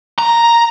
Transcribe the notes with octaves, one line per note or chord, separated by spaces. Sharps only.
A#5